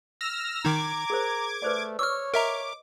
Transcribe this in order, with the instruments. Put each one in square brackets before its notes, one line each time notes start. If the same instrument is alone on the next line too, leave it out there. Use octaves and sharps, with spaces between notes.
[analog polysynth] E6 F6 A#6
[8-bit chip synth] D#3 D#4 [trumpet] A#5 [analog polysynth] D6 G#6
[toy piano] G#4 A#4 C5
[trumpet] A3 [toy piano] B4 C5 D5
[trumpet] C#5 [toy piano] C#6 D6 [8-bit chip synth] E6 F6
[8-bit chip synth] A#4 E5 A#5 [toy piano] D#5 [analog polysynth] D6